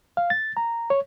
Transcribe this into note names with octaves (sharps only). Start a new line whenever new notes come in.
F5
A6
A#5
C#5